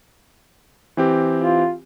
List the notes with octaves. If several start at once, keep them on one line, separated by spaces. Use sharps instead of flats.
E3 C4 G4
F4